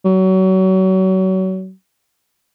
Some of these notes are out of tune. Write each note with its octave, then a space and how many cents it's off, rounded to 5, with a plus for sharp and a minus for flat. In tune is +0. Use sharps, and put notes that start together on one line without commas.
F#3 +30